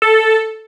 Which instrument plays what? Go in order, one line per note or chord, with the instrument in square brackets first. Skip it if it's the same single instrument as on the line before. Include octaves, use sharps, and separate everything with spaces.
[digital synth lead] A4